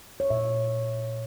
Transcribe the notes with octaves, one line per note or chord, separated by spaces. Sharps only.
C#5
A#2 E5